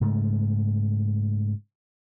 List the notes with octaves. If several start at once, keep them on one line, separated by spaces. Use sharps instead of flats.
G#2 C#3 A3